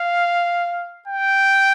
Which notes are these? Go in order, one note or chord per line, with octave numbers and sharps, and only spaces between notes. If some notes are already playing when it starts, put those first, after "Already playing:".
Already playing: F5
G5